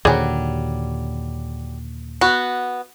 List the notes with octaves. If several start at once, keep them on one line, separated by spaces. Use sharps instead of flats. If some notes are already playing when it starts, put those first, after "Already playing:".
D#2 A#2 D3 F#3 G3 G#4 C5 D5
B3 F#4